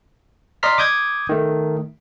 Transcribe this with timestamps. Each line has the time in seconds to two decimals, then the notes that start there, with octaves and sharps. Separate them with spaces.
0.63 D5 D#5 A#5 C6 F6 B6
0.78 D6 D#6 G6 G#6
1.29 D#3 A3